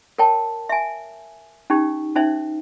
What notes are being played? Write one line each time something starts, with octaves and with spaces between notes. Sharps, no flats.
A#4 C#5 G5 A5
E5 G#5
C#4 D#4 G4
C#4 D#4 C5 E5